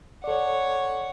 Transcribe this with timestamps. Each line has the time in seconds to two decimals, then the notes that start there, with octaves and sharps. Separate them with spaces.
0.24 A4 C#5 D5 F#5